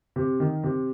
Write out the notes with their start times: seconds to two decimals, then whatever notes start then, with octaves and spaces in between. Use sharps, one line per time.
0.16 C3
0.40 D#3
0.64 C3